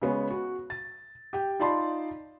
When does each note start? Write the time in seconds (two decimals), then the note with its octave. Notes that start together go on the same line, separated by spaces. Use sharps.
0.02 C#3 G#3 B3 C#5
0.30 F#4
0.70 A6
1.33 G4 G5
1.60 D#4 F4 D5 A5 B5 C6